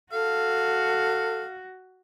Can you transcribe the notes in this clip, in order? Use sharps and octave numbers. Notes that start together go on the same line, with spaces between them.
F#4 A4 F5